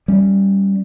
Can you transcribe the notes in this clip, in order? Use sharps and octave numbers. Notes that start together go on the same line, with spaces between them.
G3 C#4